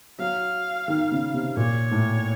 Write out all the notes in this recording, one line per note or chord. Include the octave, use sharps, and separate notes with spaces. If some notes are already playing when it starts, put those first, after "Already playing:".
F#3 F5
D#3
C#3
C3
A#2 C#5
A2